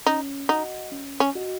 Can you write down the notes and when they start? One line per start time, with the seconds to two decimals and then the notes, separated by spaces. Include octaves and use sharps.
0.06 C#4 D#4
0.49 D#4 F#4 D#5 F#5
0.92 C#4
1.20 C#4
1.35 F#4 D#5 F#5